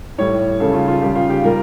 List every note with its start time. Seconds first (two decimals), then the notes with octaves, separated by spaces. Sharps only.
0.18 A2 G3 C#5
0.60 C#3 G3 A4
0.74 F4
0.88 F4
1.01 C#3 G3 G4
1.16 F4
1.30 G4
1.43 A#2 G3 A#4